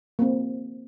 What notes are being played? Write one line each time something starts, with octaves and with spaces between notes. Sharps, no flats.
A#3 C4